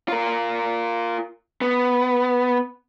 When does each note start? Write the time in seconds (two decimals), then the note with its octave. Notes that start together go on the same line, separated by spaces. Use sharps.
0.08 F4 A#4
1.61 B3